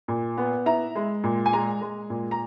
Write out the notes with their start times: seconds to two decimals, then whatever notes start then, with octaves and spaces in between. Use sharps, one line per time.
0.08 A#2
0.38 B3
0.66 E4 A#5
0.96 G#3
1.24 A#2
1.46 G#5
1.53 G#3 A#5
1.81 G#3
2.10 A#2
2.31 A#5